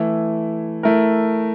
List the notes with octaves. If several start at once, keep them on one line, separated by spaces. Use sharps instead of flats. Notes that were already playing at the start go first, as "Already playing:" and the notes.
Already playing: E3 A3 E4
A3 E4 A#4